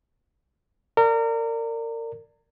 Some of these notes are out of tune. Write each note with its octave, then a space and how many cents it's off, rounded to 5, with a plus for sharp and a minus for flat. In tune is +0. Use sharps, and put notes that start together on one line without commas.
A#4 -30 D5 +0